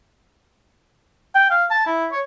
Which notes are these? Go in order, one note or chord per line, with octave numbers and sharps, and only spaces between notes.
G5
F5
A5
E4
C#5